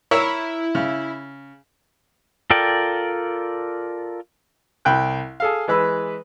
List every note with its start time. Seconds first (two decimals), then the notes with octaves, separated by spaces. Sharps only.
0.11 E4 A#4 C#5 E5
0.75 C#3
2.50 F4 A4 A#4 D5 G5
4.85 C2 G5 B5 F#6
5.40 G#4 A4 F5
5.68 E3 G#3 B4 B5 E6